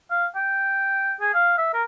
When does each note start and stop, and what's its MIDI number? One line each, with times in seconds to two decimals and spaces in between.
0.10 0.25 77
0.35 1.14 79
1.20 1.31 68
1.34 1.54 77
1.57 1.71 76
1.73 1.82 70